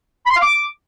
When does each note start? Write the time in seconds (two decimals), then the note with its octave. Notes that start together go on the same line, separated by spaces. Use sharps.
0.25 B5
0.30 C6
0.36 F5
0.42 D6